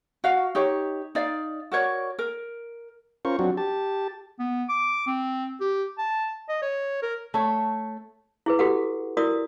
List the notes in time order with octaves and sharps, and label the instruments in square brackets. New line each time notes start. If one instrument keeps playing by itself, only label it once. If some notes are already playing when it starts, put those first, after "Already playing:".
[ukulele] F#4 F5
D#4 G4 C#5
D#4 D5 F5
F#4 A#4 C#5 D5
A#4
[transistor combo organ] C#4 F4 A#4 C5 C#6
F#3 C4 D4 F#4
G4 A5
[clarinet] B3
D6
C4
G4
A5
D#5
C#5
A#4
[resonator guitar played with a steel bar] A3 C#5
[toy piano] E4 G#4 B4
F#4 G4 A4 B4 F#5
E4 F#4 A#4 D5 D#6